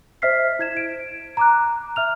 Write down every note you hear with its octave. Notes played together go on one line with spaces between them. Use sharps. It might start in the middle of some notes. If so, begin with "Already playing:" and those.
C5 D#5 E5 F6 B6 C7
E4 G#6 E7
D7
A#5 D6 F#6
E5 F6 F7